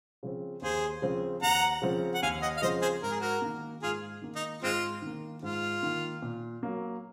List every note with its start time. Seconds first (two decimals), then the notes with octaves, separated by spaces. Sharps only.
0.23 C#3 F3 C4
0.62 D#2 G#4 C5
1.02 C#3 F3 C4
1.42 D#2 F#5 A#5
1.82 C#3 F3 C4
2.14 F#5
2.22 D#2 F5 G#5
2.42 D#5 F#5
2.57 F5
2.62 C#3 F3 C4 C5 D#5
2.82 G#4 C5
3.02 G#2 A#4
3.11 G#4
3.20 F#4 A#4
3.42 D#3 A#3
3.82 G#2 F4 G#4
4.22 D#3 A#3
4.36 D#4
4.63 G#2 G#3 C4 F4
5.02 D#3 A#3
5.42 G#2 F4
5.83 D#3 A#3
6.22 A#2
6.63 F#3 A#3